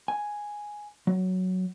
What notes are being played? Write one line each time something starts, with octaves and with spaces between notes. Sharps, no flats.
G#5
F#3